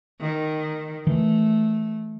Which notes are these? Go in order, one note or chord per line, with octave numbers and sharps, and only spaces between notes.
D#3
E3 A3